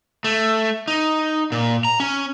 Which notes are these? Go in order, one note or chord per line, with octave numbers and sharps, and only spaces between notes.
A3
D#4
A#2
A#5
C#4